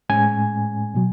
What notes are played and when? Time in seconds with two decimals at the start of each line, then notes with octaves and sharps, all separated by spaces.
0.09 A2 G#3 C#4 G#5
0.94 B2 F#3